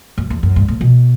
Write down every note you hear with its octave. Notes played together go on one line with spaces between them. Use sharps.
F#2
E2
F#2
G2
A2
B2